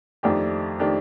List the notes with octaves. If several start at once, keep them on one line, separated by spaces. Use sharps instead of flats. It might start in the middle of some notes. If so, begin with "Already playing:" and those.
F2 D#3 A3 D4 G4
D#3 A3 D4 G4